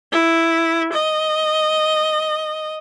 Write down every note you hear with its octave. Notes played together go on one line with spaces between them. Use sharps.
E4
D#5